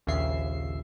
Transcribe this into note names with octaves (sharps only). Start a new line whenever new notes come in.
A#1 D#2 C#3 E5 C7